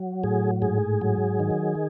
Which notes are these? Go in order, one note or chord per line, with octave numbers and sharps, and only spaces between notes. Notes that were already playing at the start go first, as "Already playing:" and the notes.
Already playing: F#3
A2 G#4
G#2 G#4
F#3
D#3